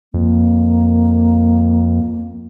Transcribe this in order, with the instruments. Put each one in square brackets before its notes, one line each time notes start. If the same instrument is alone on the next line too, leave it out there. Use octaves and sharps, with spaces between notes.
[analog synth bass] F2 [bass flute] A#3